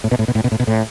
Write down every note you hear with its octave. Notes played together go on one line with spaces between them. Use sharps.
A2
B2
A2
B2
A2
B2
A2
B2
A2